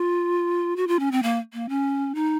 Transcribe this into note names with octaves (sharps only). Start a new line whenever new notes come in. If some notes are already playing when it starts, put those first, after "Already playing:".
Already playing: F4
F#4
F4
C#4
C4
A#3
A#3
C#4
D#4